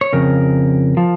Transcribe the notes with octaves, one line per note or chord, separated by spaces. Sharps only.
C#5
F2 C#3 A#4
F3